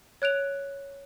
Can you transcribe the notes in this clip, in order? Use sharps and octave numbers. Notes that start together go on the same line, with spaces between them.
C#5 F#6 D7 F7